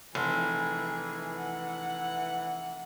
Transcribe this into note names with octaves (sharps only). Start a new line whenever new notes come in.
F1 E3 G#4
F#5